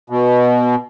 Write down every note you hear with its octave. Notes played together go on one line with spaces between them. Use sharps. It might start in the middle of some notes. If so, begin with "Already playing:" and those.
B2